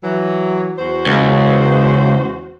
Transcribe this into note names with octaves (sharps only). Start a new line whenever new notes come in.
E3 F#3
E2 F#4 C5
C#2